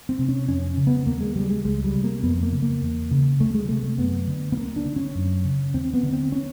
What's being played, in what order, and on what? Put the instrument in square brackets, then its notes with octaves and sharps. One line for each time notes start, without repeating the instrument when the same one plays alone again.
[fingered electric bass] C4
C3
C#4
F2 C#4
C#3
B3
D#2 A#3
G#3
C#3 G3
G#3
C#2 G#3
G3
C3
A#3
F2 B3
A#3
C#3
A#3
E2
C#3
D2 A3
G#3
C3 A3
A3
F#2 B3
D3
B3
D2 A#3
D4
D3
C#4
F#2
C#3
D#2 C4
B3
D3
C4
C#4